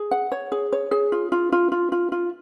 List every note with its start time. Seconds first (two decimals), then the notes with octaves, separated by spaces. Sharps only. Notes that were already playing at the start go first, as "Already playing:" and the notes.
Already playing: G#4
0.11 F#5
0.32 C#5
0.52 G#4
0.72 C#5
0.91 G#4
1.12 F4
1.32 F4
1.52 F4
1.72 F4
1.92 F4
2.12 F4